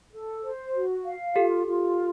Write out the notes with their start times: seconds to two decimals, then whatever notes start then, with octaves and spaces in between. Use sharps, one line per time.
0.11 A4
0.43 C5
0.74 F#4
1.05 F5
1.35 F4 G4 A4
1.67 F4